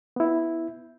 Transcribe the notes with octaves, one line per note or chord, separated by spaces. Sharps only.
B3 E4